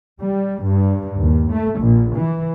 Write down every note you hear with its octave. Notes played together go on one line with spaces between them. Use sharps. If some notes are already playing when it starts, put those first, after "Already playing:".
G3
G2
D#2
A3
A#1
E3